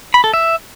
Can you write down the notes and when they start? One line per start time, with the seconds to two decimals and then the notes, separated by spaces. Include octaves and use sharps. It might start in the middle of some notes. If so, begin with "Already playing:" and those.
0.14 B5
0.24 A4
0.34 E5